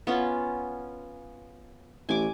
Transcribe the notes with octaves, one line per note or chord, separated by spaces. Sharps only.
B3 C#4 F4
A1 G#5 D6